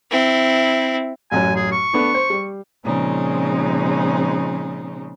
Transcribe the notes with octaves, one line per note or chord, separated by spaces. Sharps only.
C4 E4
A1 F#2 F#3 G#5
G#4
C#6
A3 B3 D4
C5
G3
A#2 C#3 F3 G#3 C4 D#4